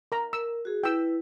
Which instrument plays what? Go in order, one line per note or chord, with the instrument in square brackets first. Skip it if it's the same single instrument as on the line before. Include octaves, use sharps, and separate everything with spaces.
[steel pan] A#4 A#5
[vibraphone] A#4 [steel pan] E6
[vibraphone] F#4 G#4
[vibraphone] E4 B4 [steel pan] G5 E6